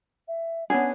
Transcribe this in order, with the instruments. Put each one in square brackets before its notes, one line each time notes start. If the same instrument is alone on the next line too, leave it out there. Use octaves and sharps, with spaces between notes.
[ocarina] E5
[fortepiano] B3 C#4 D4 [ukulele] G#4 [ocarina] F#5